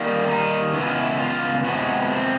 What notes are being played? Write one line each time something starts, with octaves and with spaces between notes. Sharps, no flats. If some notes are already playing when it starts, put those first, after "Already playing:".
Already playing: D#3 G3 A#3
D4
D#4
C#3 E3 G#3 B3 E4
F4
E4
F4
C3 F3 G#3 B3 F#4
C4